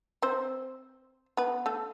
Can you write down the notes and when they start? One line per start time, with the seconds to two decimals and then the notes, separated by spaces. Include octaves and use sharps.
0.22 C4 C5
1.37 B3 B4
1.66 A3 A4